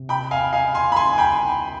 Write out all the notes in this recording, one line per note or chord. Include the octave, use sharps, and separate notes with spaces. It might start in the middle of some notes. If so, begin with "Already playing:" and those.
Already playing: C3
G5 B5
F5 G#5
F5 G#5
G#5 C6
B5
G#5 C6
G#5
G5 B5